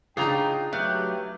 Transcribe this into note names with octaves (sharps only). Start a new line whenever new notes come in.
C#3 D4 D#4 F4 G#4 G5 A#5
F#3 A3 G4 B4 F5 F#6